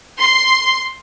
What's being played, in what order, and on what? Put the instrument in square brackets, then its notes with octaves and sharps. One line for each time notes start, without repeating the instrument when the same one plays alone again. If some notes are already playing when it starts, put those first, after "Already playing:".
[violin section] C6